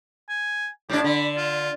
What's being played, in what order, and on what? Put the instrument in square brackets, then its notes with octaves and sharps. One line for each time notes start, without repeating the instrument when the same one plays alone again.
[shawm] G#5
[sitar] A2 D4 [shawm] G4
[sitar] D3 [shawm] B5
[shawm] F4